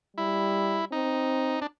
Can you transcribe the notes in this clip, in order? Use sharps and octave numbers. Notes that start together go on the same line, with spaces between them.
G3 E4
C4 D#4
D4